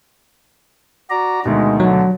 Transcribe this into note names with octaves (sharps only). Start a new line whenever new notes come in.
F#4 D5 A#5
D2 B2 D#3 G#3 D#4
D3 F#3